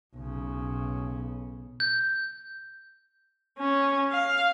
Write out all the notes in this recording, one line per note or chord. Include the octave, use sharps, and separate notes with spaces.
B1 C#3
G6
C#4
F5